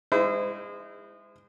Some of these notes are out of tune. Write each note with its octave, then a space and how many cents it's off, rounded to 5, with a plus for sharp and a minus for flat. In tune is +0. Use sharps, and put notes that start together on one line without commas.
G#3 -30 E4 +0 C5 -35